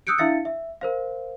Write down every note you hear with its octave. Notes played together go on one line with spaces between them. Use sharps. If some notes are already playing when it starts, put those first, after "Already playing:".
D#6 E6 F#6 G6 C#7 D7
D4 E4 E5 F5 A6 C#7
E5
A#4 C5 F5